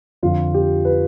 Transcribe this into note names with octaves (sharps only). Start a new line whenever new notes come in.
F2 D3 F3 F4
G4
B4